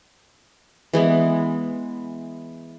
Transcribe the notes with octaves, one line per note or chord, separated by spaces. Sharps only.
E3 G#3 B3